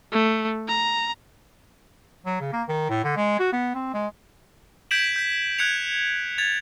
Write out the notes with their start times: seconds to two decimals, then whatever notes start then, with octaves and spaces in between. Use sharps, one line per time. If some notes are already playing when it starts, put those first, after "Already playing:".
0.12 A3
0.68 A#5
2.26 F#3
2.40 C#3
2.53 A#3
2.69 D#3
2.90 A2
3.04 D3
3.17 G#3
3.39 F#4
3.53 B3
3.75 C4
3.94 G#3
4.91 G6 G#6 B6 D7 E7 F#7
5.16 G6 B6
5.58 F#6 G#6 C#7 F7
6.38 G#6 A6 F7